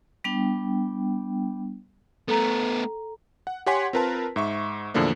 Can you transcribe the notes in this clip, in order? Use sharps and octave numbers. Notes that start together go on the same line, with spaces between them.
G3 B3 D4 G5
A3 B3 A4 A#5
F#5
G4 C#5 F#5 G#5 C6 B6
C4 F4 A#4 B4 A5
G#2 E5 C#6
E2 A2 D3 F3 A#3 D4